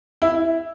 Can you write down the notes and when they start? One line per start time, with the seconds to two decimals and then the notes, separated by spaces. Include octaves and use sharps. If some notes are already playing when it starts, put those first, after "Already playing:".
0.22 E4